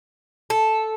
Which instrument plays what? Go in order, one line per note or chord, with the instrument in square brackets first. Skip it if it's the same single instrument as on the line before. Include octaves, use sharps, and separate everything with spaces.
[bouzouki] A4